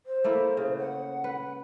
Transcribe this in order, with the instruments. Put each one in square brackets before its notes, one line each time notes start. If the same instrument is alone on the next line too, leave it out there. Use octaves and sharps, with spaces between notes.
[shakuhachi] C5
[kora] A3 A#3 E4
C#3
[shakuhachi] F#5
[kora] B4